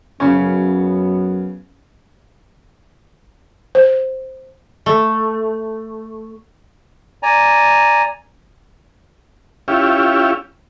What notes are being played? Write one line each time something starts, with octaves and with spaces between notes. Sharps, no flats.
F#2 C#3 B3 C#4
C5
A3
D5 G#5 A#5
C#4 E4 F4 G4